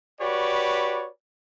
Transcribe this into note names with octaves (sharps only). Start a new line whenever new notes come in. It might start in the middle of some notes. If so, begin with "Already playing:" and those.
F#4 G4 B4 C#5 D5 B5